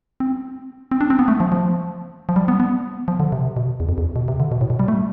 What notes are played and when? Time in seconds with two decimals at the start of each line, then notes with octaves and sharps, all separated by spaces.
0.20 C4
0.91 C4
1.01 D4
1.10 C4
1.19 B3
1.28 A3
1.40 F3
1.52 F3
2.29 F3
2.36 G3
2.48 B3
2.60 B3
3.08 F3
3.20 D3
3.32 C3
3.57 B2
3.80 E2
3.89 F2
3.98 E2
4.16 B2
4.28 C3
4.40 D3
4.52 B2
4.61 A2
4.70 B2
4.79 G3
4.88 A3